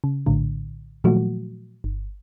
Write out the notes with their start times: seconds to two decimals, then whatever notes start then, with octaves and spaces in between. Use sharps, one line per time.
0.04 C#3
0.26 A#1 A2 D3
1.04 A#2 D#3 F3 F#3 A3 F#4
1.84 G1